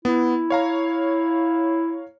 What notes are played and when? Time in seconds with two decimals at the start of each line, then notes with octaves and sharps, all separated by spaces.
0.05 B3 E4
0.50 C#5 F5 A#5